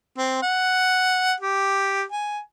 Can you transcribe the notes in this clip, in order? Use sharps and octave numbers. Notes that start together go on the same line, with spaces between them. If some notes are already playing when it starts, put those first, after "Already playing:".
C4
F#5
G4
G#5